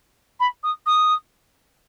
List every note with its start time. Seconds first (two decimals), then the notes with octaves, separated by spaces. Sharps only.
0.40 B5
0.63 D#6
0.86 D#6